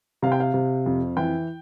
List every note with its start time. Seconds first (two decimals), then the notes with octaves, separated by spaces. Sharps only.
0.22 C3 F5
0.32 G5
0.40 F5
0.54 C3
0.86 F2
1.17 E3 G5